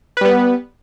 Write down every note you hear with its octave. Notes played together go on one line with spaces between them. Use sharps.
G3 B3 B4